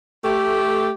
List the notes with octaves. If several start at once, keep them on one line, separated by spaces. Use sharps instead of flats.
A3 G4